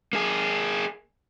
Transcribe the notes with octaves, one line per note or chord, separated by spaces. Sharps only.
A#3 G#4